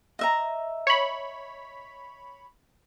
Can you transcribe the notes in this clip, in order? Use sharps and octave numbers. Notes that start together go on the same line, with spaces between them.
D#5 E5 A#5
C#5 B5